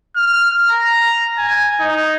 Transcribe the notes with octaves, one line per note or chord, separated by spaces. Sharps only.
F6
A#5
G#5
D#4